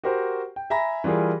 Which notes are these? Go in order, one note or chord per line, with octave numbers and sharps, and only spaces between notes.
F#4 G4 A#4 C5
G5
E5 G#5 A#5 B5 A#6
E3 G3 F4 G#4 A#4